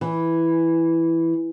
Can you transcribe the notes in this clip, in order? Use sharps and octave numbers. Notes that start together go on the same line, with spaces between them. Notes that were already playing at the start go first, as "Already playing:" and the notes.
E3